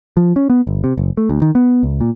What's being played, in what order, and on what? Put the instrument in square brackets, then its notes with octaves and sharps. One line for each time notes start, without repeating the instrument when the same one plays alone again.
[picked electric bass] F3
C#4
B3
G1
C3
F#1
A3
D2
D#3
B3
C#2
A#2